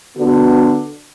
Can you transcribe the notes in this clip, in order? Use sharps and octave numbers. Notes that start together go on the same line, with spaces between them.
D3 B3 D4 F#4